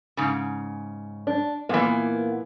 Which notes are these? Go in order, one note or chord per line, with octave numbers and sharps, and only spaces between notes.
G#2 C#3
D4
A#2 E3 A#3 B3